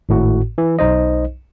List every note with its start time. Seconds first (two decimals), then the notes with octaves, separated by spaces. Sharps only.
0.09 G#1 A2 F#4
0.58 E3
0.79 B1 D#4 C5 D#5